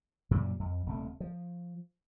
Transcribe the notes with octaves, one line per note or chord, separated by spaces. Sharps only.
F#2 A#2 C#3 G3
F2
D#1 C3 A3
F3